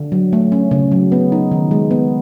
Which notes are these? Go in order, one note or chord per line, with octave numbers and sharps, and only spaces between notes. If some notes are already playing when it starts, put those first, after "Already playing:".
Already playing: D3
F#3
A3
C#4
C#3
F#3
B3
D#4
D#3
G#3
B3